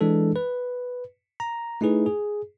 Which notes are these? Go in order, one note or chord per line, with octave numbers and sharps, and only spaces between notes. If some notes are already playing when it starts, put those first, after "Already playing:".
E3 G#3 D4 A4
B4
A#5
A3 D#4 E4 G#4 B4
G#4